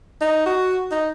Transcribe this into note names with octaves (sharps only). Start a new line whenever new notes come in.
D#4
F#4
D#4